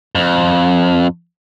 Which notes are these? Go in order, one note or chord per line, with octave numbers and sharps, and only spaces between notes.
F2